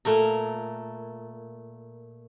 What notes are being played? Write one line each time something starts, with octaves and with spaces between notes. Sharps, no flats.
A#2 A3 A#4 A#5